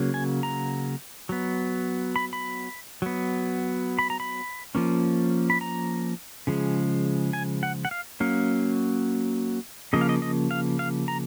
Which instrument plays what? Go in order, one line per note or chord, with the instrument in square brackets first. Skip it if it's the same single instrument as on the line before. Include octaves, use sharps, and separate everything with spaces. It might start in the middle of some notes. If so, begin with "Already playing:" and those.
Already playing: [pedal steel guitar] C#3 F#3 A#3
G#5
A#5
F#3 B3
B5
B5
F#3 B3
B5
A#5
B5
F3 A#3 C#4
B5
A#5
C#3 F3 G#3
G#5
F#5
F#5
F5
F#3 A#3 C#4 F5
C#3 F3 A#3 D#5
F5
D#5
D#5
F5
F5
A#5